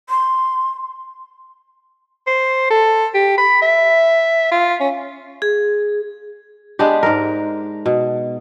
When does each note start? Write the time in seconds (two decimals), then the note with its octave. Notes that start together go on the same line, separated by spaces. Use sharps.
0.09 C6
2.27 C5
2.70 A4
3.15 G4
3.38 B5
3.62 E5
4.51 F4
4.80 C#4
5.42 G#4
6.79 G#3 B3 D4 G4
7.03 G#2 A#4
7.86 B2